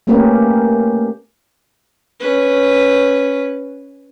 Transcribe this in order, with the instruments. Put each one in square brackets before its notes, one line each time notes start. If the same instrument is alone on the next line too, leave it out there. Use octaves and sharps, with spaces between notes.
[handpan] A3 A#3 C#4 G4 A#4 B4
[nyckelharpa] C#4 B4